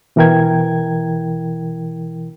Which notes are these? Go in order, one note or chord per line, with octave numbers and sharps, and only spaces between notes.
B2 E3 E4 A#4 G5 G#6